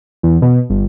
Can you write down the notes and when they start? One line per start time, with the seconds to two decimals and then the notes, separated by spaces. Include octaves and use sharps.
0.23 E2
0.42 B2
0.70 G1